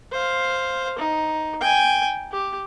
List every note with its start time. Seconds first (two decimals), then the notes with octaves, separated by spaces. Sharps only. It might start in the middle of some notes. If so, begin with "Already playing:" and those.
0.12 C5 F5
0.98 D#4
1.61 G5 G#5
2.32 G4